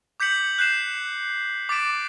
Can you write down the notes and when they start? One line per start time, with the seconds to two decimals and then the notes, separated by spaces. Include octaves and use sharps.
0.20 D6 G6 B6 C#7 F#7
0.58 F#6 G6 C7 E7
1.69 D6 A6 B6 D7 E7